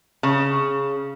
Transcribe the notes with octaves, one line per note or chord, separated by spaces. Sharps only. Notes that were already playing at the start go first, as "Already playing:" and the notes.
C#3